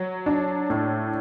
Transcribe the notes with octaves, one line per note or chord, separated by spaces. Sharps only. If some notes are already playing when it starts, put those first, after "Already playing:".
Already playing: F#3
D4
A2